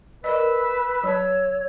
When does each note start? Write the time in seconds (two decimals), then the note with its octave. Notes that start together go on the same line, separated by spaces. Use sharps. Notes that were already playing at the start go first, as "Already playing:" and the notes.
0.24 A#4 B4 D5 D#5 E6
1.04 F#3 C#5 A5